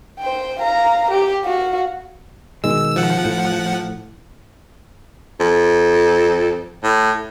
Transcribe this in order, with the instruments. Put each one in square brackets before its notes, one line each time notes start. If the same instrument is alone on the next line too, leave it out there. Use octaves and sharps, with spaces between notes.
[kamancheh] C5 G5
F5 A#5
G4
F#4 F5
[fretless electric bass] B2 D#3 G#3 [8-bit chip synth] E6
[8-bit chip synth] F3 F#5
[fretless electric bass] A2
[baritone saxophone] F2
A2